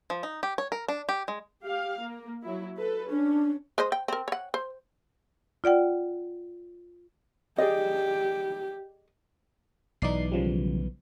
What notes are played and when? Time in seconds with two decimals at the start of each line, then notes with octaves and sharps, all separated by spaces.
0.10 F3
0.23 D#4
0.43 G4
0.58 C#5
0.72 A#4
0.88 D4
1.09 G4
1.28 G#3
1.63 G4 F5
2.01 A#3
2.43 F#3 E4
2.77 A4 B4
3.09 C#4 D4
3.78 G#3 C5 D#5
3.92 G5
4.08 C4 A#4
4.28 C#5 F#5
4.54 C5
5.64 F4 D5 F#5 G5
7.58 G4 G#4 D5 D#5
10.02 B1 E3 D#4 D5 C7
10.32 C#3 F3 G3